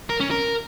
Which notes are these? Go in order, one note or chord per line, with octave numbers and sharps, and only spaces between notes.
A#4
C#4
A#4